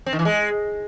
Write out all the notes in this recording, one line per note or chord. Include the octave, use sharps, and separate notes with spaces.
C4
D#3
E3
G#3